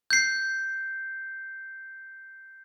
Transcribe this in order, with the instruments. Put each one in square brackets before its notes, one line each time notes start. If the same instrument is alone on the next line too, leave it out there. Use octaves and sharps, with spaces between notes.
[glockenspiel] G6 C7